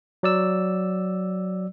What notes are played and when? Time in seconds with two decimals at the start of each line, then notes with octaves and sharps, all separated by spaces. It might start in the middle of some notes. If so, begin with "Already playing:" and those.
0.23 F#3 D5 E6